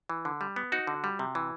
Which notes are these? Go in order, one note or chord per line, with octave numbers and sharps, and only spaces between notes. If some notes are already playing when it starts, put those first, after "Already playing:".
E3
D3
G3
B3
D#4 F#4
D3
G3
C3
E3